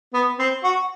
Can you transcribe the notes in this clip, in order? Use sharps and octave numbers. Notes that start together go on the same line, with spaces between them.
B3
C4
F#4